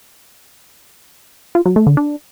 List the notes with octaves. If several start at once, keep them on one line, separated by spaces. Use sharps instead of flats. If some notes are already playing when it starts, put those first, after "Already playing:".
F4
F#3
A3
D3
D4